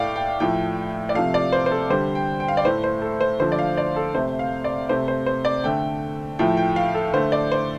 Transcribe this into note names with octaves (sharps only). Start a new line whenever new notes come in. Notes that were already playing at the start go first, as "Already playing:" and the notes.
Already playing: A2 A3 D5 F5 G5
G5
A2 F3 A3 G5
D5
C3 F3 A3 F5
D5
C5
C5
A4
D3 G3 C5
G5
G5
F5
D5
A2 A3 C5
C5
A4
C5
D3 F3 A3 C5
D5
F5
D5
A4
C3 A3 C5
F5
D5
C3 A3 C5
C5
C5
D5
D3 A3 G5
A2 F3 A3 G5
G5
F5
A4
D3 A3 C5
D5
C5